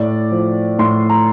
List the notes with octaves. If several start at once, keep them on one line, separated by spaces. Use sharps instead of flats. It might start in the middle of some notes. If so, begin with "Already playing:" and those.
Already playing: A2 D5
F3
A2 C6
A#5